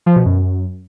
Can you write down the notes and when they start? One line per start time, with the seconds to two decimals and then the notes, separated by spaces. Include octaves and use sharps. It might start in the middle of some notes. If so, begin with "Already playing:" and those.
0.06 F3
0.16 B2
0.26 F#2